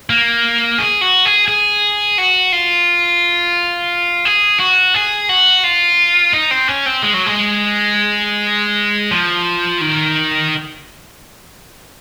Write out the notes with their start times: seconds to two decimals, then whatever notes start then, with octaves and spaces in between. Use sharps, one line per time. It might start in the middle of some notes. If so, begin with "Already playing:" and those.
0.10 A#3
0.78 G#4
1.01 F#4
1.25 G#4
1.48 G#4
2.18 F#4
2.52 F4
4.25 G#4
4.60 F#4
4.94 G#4
5.29 F#4
5.64 F4
6.33 D#4
6.51 C4
6.68 C#4
6.86 C4
7.03 G#3
7.14 F#3
7.26 G#3
9.11 F3
9.81 D#3